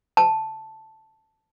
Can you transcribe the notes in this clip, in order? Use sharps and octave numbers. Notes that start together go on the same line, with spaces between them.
A5